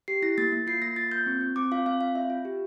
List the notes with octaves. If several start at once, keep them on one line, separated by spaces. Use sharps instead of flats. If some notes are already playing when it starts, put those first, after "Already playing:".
G4 C7
E4 A#6
A#3 A6
A#3
F4 C7
A#3 A#6
F4 A6
A#3 G6
C4
C4
C4 D6
F4 F5
C4 F5
C4 F5
F4 E5
F4
G4